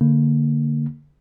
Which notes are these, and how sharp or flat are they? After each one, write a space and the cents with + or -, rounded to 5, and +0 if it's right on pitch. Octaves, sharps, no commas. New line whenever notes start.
D3 -10 A#3 -15